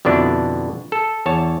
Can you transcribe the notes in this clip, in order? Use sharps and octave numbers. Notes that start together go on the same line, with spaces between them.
F2 B2 D3 D4 E4
A4
E2 C#5 A5